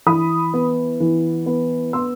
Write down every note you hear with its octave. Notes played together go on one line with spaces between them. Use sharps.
E3 B5 D#6
B3
E3
B3
B3 C6 E6